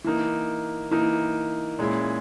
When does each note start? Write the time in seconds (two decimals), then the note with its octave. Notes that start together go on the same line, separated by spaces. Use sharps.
0.04 E3 A#3 D#4
0.91 E3 A#3 D#4
1.79 A#2 G#3 C#4 E4